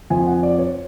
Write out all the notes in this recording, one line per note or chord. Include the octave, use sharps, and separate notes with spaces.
F2 F3 G#5
F#5
D5
C#5